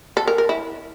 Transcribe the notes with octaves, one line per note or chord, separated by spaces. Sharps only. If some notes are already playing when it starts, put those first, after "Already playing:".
A4
A#4
A#4
E4